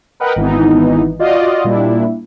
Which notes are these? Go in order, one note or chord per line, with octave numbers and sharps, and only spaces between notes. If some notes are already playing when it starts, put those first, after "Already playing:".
A#4 B4 D#5 F#5 G5
G#1 E3 B3 D#4
F4 F#4 D5 D#5
A#2 G3 D4 E4